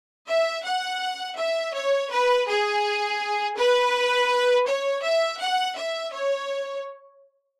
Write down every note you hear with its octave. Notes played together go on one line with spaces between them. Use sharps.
E5
F#5
E5
C#5
B4
G#4
B4
C#5
E5
F#5
E5
C#5